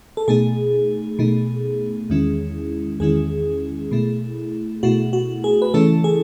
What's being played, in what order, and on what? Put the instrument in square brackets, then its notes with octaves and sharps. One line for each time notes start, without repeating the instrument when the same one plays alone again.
[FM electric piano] A4
B2 A3 D#4 G#4
B2 A3 D#4
E2 D#3 G#3 C#4 E4
E2 D#3 G#3 C#4 E4 G#4
B2 A3 E4
B2 A3 E4 F#4
F#4
G#4
B4
C#3 E3 A3 C#4 E4 A4
G#4